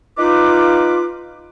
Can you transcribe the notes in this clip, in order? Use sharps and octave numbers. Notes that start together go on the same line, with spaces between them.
D#4 F4 B4 D6